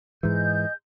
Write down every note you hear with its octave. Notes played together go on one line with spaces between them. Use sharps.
G#2 E3 G#4 D#5 G6